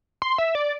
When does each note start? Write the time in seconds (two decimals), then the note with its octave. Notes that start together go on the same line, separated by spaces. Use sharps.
0.22 C6
0.38 E5
0.55 D5